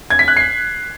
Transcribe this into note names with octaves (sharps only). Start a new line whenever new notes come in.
G#6
B6
F#6
C7